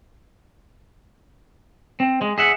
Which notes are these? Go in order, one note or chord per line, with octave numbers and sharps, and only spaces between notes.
C4
G#3
G#4 E5 F#5